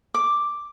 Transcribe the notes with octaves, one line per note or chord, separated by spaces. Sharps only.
D6